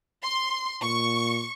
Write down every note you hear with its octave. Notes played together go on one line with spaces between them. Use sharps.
C6
A#2 C#6